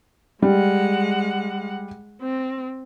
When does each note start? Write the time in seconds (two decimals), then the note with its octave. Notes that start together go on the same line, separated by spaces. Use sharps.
0.42 G3 G#3 F#5
2.22 C4